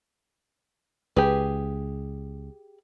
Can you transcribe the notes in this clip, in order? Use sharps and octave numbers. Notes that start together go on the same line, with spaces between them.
C#2 G4 G#4 B4